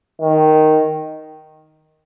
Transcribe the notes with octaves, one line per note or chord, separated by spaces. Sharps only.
D#3